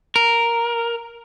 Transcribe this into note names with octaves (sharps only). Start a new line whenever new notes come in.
A#4